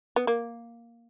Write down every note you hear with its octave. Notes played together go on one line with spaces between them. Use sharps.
B3
A#3